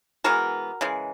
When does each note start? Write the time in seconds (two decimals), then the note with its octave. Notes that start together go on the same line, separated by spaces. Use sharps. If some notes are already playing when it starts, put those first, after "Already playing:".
0.24 E3 G#3 B3 F#4 A#4
0.81 C#3 E3 G#3